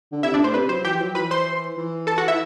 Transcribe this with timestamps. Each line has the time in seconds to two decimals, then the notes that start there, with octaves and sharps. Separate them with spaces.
0.12 D3
0.23 C3 E4 E5
0.34 D4 D5
0.39 A2
0.44 C5
0.54 C3 B4
0.69 F#3 C5
0.85 E3 G4 G5
1.01 F#3
1.15 E3 B4 B5
1.31 C5 C6
1.77 E3
2.07 A4 A5
2.18 F#4 F#5
2.28 E4 E5